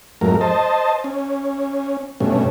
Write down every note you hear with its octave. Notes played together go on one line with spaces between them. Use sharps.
F2 G#2 F#3 A3 A#4
C5 D#5 A5
C#4
G2 B2 A3 C#4